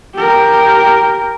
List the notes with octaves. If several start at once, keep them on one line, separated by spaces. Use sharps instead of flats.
G4 A#4